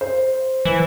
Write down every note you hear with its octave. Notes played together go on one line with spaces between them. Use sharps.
C5
E3